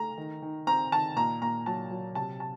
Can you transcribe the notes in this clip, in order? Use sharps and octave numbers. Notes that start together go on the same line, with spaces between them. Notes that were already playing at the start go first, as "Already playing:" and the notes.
Already playing: A3 A#5
D#3
D#3
C4 A#5
D#3 A5
A#2 A#5
A#2 A#5
F#3 A5
F#3
C3 A5
A5